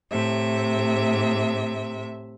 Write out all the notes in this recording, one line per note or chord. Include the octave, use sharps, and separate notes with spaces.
A2 C3 E5